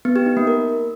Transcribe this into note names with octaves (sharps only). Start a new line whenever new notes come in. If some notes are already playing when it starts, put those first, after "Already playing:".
B3
G4
D#4
A#3
A#4